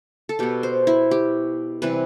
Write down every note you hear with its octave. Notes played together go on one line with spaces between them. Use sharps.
A4
B2 B3 G4
C5
E4
G4
C3 E3 G3 B4